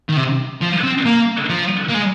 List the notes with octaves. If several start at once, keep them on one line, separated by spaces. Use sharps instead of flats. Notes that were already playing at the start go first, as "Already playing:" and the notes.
D#3
C3
F3
C4
A#3
F3
A#3
G#3